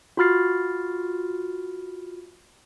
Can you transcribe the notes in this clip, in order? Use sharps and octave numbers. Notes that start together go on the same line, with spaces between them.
F4 F#4 B5 F6 A6 C7